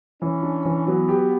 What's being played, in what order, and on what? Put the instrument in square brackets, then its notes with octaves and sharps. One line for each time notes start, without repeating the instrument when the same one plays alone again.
[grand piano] E3 [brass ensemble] C#4
[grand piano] D4
E3
[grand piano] F#3 [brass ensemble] B3
[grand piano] G4